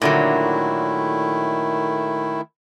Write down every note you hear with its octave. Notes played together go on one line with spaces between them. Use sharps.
A#2 D3 D#3 F#3 A3 E4